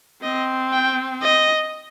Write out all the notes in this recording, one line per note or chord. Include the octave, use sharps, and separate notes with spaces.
C4 D#5
G5
D#5